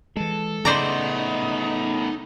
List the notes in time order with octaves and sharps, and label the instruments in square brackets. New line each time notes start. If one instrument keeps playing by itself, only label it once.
[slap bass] E3 G#3 [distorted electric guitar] A4
[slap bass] C#3 [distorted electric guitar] A3 B3 [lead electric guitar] D#4 [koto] C5 D5 A#5